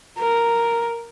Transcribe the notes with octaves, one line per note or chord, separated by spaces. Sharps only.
A#4